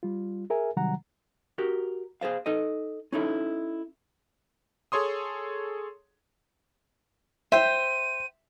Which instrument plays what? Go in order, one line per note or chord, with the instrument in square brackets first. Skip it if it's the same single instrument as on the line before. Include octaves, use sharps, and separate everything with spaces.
[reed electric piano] G3 F4
G#4 A#4 E5 G#5
C3 D#3 F#3 G3 F#5 A#5
[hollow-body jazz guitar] F#4 G4 A#4
G#4 A4 C5 F5
D#4 A4 D#5
C#4 D#4 E4 A4
[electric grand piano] G#4 A4 C#5 C6 D#6
[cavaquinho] C5 G5 [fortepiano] E5 [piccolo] D#7